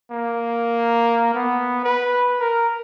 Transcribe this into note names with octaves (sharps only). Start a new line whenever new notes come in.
A#3
B3
B4
A#4